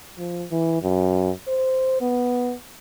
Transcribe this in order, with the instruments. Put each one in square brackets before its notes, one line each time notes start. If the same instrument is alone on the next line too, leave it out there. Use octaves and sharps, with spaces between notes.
[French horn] F3
E3
F#2
C5
B3